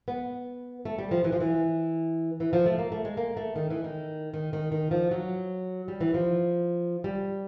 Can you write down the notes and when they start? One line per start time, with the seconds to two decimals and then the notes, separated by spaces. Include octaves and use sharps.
0.08 B3
0.85 A3
0.99 G3
1.11 F3
1.24 E3
1.32 F3
1.40 E3
2.40 E3
2.53 F3
2.66 A3
2.79 A#3
2.92 A3
3.05 G#3
3.17 A#3
3.37 A3
3.56 D#3
3.70 E3
3.84 D#3
4.34 D#3
4.53 D#3
4.72 D#3
4.91 F3
5.11 F#3
5.88 G3
6.01 E3
6.14 F3
7.04 G3